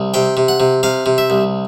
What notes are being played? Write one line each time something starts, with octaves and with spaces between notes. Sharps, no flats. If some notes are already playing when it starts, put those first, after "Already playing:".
Already playing: C2
C3 G5
C3
F#5
C3
C3 F5
C3
E5
C2